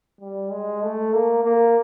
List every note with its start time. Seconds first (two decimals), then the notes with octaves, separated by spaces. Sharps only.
0.21 G3
0.52 G#3
0.83 A3
1.14 A#3
1.44 A#3